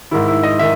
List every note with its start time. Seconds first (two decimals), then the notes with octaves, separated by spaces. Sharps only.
0.11 G#2 D#3 E4
0.28 E4
0.43 D#5
0.59 D#3 E5